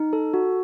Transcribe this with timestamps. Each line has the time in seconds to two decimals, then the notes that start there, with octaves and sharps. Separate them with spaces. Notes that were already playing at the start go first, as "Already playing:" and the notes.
Already playing: D#4
0.13 A4
0.34 F#4